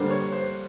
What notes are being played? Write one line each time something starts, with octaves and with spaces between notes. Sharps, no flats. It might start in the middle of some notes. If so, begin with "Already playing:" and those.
Already playing: D3 G3 A#3 D4 C5
C#5
C5